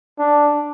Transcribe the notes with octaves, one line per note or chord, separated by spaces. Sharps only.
D4